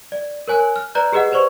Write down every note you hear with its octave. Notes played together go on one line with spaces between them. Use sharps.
D5
A#4 C#5 G#5 F#6
F6
B4 D5 A#5 F#6 G6
G4 G#4 B4 D#5 F#5
B4 C5 D5 C#6